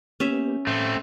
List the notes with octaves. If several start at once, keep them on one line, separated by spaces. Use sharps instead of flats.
A#3 B3 C#4 G4 E5
A2 A3 C4